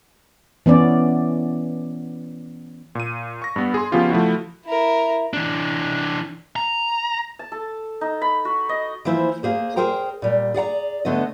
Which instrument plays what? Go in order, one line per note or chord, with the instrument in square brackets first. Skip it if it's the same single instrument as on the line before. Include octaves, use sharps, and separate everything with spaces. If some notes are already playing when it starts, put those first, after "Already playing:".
[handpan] E3 B3 C#4 D5
[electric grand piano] A#2 D#7
C#6 A#6
G2 B3
G#4 C6
C#3 F3 B3 C#4 F4 G4
F3 A3 E4 F#4
[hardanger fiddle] E4 A#4
[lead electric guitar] E3 D4
A#5
[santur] A5
A4
D#4
B5
F#4
D#5
[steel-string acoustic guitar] E3 F3 A#3 E4 C5
A#3 G#4 C5
G#4 A#4 C5 G5 A#5
A#2 G3
G#4 D5 F#5 A#5
D3 A3 B3 D#5